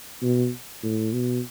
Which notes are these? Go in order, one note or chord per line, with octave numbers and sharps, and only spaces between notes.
B2
A2
B2